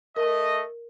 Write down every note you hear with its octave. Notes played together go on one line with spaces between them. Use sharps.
A3 A#4 D#5